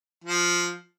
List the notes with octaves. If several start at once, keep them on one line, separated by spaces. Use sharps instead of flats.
F3